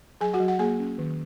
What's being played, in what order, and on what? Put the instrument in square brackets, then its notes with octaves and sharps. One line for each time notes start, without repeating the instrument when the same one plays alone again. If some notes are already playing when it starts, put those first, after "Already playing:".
[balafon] F#3 G#4 G#5
F#4 F#5
F#3
F#5
A#3 G#4 G#5
C#4
D#3